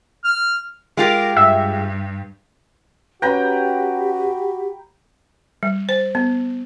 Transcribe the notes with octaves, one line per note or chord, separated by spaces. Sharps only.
F6
G#3 F4 G4 A#4
G2 E5
C#4 F#4 G4 B4 G5 A#5 B5
G3
C5
B3